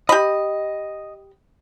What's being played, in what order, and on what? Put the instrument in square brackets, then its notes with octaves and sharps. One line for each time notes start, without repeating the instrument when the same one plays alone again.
[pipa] G4 B5 [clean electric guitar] D#5